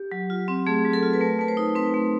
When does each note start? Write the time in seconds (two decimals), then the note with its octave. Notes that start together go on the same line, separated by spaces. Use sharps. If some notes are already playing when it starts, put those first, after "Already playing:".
Already playing: G4
0.12 F#3
0.30 F4
0.48 C4
0.67 A3 G#4
0.85 F#3
0.93 A4
1.03 F4
1.13 B4
1.21 A3 A#4
1.39 A3 B4
1.48 C5
1.57 D#4
1.75 C4 B4
1.94 A3